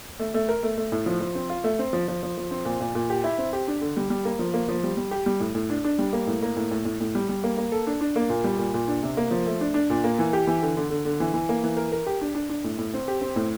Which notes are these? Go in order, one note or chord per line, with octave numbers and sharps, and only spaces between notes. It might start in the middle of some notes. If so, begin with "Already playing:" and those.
A3
A3
A#4
A3
A3
A2
F3
F3
C4
F4
A3
C4
F3
F3
F3
F3
C4
A#2
A#2
A#2
G4
E4
C4
G4
D4
D3
G3
G3
A#3
F3
A#3
F3
G3
G3
G4
G3
A2
A2
D4
D4
G3
A#3
A2
A#3
A2
A2
A2
A2
G3
G3
A#3
A#3
A4
D4
D4
A#3
A#2
G3
A#2
A#2
D4
C3
A#3
F3
A3
D4
D4
A#2
A#3
E3
G4
E3
D3
D3
D3
D3
E3
E3
A#3
E3
A#4
A#4
G4
D4
D4
D4
A2
A2
C4
G4
C4
A2